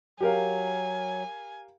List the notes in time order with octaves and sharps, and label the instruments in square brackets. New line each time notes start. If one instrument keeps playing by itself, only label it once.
[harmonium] F#3 [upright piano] G4 A#4 F5 [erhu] G#5